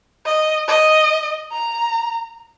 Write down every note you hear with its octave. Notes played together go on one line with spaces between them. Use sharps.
D#5
D#5
A#5